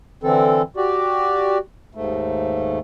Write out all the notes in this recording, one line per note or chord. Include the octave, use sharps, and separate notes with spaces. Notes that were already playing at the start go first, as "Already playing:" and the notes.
D3 E3 C4 A4
F#4 G4 D5
D#2 G#2 A3